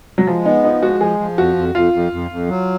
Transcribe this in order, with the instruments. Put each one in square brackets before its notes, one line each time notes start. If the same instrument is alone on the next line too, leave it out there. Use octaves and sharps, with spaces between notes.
[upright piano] F#3
[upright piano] F3 [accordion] G#3
[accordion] B3 [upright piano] D#4
[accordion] F3 [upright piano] D#4
[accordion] G#3 [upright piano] F#4
[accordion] F3 [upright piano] G#4
[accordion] F3
[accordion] F2 [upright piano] F#4
[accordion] F2
[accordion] F2 [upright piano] F4
[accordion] F2
F2
F2
F#3